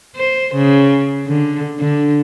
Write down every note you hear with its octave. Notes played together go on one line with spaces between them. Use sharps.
C5
C#3
D3
D3